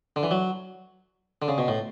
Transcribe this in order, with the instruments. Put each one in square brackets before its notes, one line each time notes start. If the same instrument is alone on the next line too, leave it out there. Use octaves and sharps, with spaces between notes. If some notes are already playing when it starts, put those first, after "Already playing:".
[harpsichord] D3
E3
F#3
D3
C#3
B2
A2